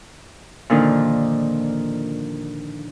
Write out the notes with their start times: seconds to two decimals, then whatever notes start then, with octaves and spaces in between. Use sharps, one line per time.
0.70 A#2 D3 D#3 F3 A#3 D4